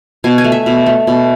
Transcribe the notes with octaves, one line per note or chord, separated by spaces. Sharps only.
B2 G#5
G#5
A3
E5
B2
A3
B2